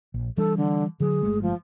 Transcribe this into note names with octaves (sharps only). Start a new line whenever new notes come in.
A#1
E3 G3 D4 A4
D3
D3 F#3 G#4
G1 G#3 A3
F3